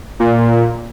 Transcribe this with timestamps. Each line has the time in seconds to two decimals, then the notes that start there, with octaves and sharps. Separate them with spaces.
0.20 A#2